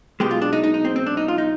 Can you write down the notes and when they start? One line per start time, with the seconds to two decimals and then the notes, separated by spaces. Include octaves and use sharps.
0.20 B1 B2 G#3 G4
0.31 F4
0.42 D4
0.53 D#4
0.63 D#4
0.74 D#4
0.85 C4
0.96 C4
1.06 D4
1.17 D#4
1.28 F4
1.38 D#4